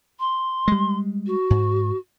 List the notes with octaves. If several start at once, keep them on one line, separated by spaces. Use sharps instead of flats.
C6
G3 G#3
F#4
G#2